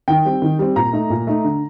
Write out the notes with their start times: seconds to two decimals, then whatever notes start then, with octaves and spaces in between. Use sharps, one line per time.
0.08 D#3 G5
0.25 G3 C4
0.42 D#3
0.59 G3 C4
0.76 A#2 A#5
0.93 A3 D#4
1.10 A#2
1.27 A3 D#4
1.44 D3